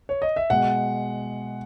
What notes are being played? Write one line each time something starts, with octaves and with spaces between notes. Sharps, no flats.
C#5
D#5
E5
B2 G#3 F#5